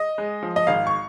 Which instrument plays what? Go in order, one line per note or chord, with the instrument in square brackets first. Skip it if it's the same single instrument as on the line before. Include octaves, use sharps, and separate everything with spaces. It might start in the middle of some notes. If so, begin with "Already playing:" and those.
Already playing: [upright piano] D#5
G#3
F3
D#5
G#1 F5
C#6